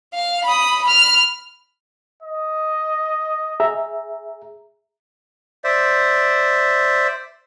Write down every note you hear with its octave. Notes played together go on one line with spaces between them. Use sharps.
F5
B5 D#6
B5 F6
D#5
G#4 E5 A#5
C5 D5 E5